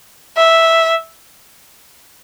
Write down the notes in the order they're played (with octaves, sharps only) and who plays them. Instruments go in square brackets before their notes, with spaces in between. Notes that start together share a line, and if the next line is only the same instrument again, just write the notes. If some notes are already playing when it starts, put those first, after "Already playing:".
[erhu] E5